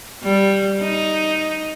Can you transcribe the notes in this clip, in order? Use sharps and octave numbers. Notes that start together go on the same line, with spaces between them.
G3
D#4